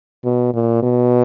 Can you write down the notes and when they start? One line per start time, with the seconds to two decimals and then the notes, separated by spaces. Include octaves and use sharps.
0.24 B2
0.54 A#2
0.83 B2